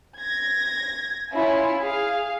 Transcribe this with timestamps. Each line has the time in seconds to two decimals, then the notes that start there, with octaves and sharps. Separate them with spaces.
0.17 G#6 A#6
1.30 C#4 E4 F4 E5 G#5
1.79 G#4 F5